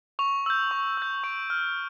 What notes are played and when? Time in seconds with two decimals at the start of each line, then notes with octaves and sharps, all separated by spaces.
0.19 C#6 F7
0.46 E6 G6
0.71 C#6
0.97 E6 G6
1.24 C#6 D7
1.50 F6